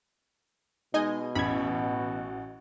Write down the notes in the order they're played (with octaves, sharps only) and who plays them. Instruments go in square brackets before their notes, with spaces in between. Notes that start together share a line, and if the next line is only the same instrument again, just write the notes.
[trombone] B2 [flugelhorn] G#3 [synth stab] D#4 D#5 G#5
[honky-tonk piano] A1 [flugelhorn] F#4 [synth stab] B5 G#6